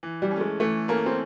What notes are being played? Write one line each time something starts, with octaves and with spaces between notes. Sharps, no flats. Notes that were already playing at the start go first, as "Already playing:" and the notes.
E3
G3
A3 C#4
G#3
E3 A3
A3 A#3 C#4
C4